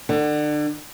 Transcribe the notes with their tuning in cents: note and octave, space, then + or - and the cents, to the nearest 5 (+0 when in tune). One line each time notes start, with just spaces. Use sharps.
D3 +30